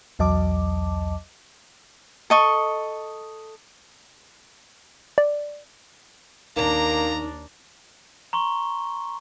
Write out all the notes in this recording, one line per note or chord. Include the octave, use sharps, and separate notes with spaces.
B1 E2 F#3 D#5 A5 D6
A4 D#5 C#6
D5
D#2 D#3 A#3 D4 A#5
A#5 C6 C#6 G7